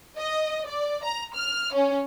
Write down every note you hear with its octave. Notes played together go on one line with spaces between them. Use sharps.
D#5
D5
A#5
F6
C#4